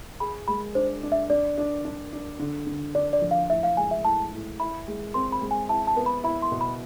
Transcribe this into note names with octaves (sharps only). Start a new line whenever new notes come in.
G#4 B5
G#3 B5
D4 C5
D4
E5
D4 D5
D4
D4
D4
D3
D3
D4 D5
D5
F3
F5
A2 E5
F5
G#3 G#5
E5
A2 A5
A2
E4 B5
G#3
C4 C6
B5
G#3
G#5
E4 A5
A5
B3
B5
E4 B5
C6
B2
B5